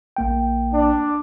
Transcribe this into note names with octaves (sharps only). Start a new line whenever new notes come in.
A#1 A#3 G5
D4